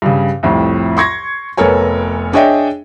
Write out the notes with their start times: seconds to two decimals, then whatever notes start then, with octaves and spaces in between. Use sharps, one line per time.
0.02 G2 C#3
0.43 C2 F2 A2
0.97 C6 C#6 G#6 A#6
1.57 F1 B3 A4 A#4 C#5 G#5
2.33 D4 G#4 C#5 D#5 E5 G5